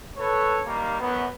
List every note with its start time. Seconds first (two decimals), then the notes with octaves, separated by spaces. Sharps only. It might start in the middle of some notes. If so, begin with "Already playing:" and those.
0.17 A4 B4 C#5
0.65 D#3 G3 A#3
1.00 F#2 B3